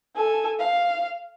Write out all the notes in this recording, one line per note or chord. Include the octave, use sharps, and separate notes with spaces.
A4 G#5
F5